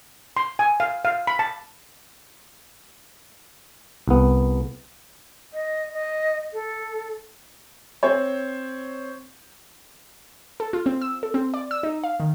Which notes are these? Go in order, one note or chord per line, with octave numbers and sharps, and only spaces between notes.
C6
G#5
F5
F5
B5
A5
C2 B3
D#5
D#5
A4
C4 C5 C#5
A4
F4
C4
E6
A4
C4
D5
E6
D#4
F5
D#3